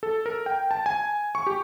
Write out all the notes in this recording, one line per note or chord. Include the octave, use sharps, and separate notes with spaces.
A4
A#4
G5
A5
G#5
C#6
G4